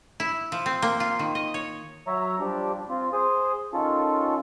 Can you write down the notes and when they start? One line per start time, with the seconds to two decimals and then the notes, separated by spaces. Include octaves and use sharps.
0.20 E4
0.52 F3
0.66 C4
0.82 A#3
1.00 F4
1.19 D#3
1.35 D#5
1.54 C#5
2.07 F#3 C#5 E5 A#5
2.40 F3 G3 D4 G4
2.89 C4 F4
3.13 G#4 C5 D#6
3.73 D#3 C#4 F4 A4